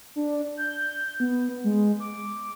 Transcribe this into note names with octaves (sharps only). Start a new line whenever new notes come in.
D4
G6
B3
G#3
D6